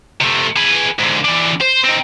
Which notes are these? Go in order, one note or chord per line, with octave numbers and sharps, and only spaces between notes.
C3 A3
G#4 B4
G#2 D3
E3 D4
C5
C4 D#4